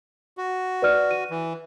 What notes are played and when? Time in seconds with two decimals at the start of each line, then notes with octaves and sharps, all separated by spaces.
0.37 F#4
0.82 B4 D5 F6
1.11 D#7
1.30 E3